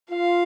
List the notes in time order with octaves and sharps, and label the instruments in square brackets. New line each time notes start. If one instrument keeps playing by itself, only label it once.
[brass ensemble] F4 [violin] F5